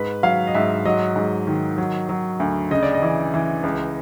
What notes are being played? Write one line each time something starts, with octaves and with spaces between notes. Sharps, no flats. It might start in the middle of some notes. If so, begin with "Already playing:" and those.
Already playing: G#2 B4
F#3 F5
D#5
G#2 E5
F#3 D#5
G#2
D#3
F#3
F#3
D2
C#3 D#5
D5
D#5
E3
E3
C#2